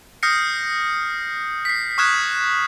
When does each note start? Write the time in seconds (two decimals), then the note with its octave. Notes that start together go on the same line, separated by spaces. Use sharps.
0.23 D#6 F6 G6 A#6 C7 C#7
1.65 B6 C7
1.98 C#6 D#6 F6 F#6 G#6 E7